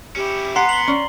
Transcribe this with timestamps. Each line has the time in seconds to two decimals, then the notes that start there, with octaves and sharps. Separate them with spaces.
0.16 C#4 E4 G4
0.56 B3 F#5 A#5 C6 C7
0.69 F#7 G7
0.88 C#4 D5